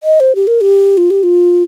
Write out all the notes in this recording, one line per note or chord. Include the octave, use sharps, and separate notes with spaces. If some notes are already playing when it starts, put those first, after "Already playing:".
D#5
C5
G4
A#4
G4
F4
G4
F4